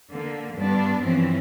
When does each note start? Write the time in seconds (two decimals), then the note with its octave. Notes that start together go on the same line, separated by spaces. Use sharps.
0.10 D3 A#3
0.55 G2 B3 D4
1.00 G2 E3 F3 C4 C#4